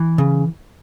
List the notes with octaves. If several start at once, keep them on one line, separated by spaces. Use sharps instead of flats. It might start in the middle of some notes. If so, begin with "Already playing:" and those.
Already playing: E3
C#3